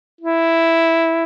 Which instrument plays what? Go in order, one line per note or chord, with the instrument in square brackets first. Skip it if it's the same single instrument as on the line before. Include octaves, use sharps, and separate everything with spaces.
[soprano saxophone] E4